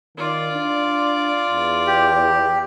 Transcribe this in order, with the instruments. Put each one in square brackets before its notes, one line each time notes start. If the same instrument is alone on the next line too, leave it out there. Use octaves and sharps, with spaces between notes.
[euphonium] D#3 [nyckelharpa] F4 D5
[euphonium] D4
E2
[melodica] G4